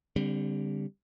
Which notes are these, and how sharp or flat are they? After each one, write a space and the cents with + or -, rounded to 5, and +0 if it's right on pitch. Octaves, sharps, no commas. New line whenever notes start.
D3 -15 G3 +20 C4 -25